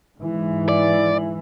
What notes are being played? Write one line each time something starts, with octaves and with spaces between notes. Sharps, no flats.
G#2 E3
D5